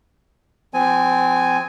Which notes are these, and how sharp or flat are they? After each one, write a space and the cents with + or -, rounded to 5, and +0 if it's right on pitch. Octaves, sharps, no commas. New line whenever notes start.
F3 +0 C4 -25 G#5 +0